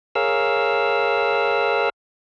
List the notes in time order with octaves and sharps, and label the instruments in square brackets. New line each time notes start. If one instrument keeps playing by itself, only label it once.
[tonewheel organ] G#4 A#4 C#5 F5 E6